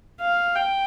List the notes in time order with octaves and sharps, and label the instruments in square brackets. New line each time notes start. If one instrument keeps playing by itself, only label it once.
[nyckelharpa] F5
G5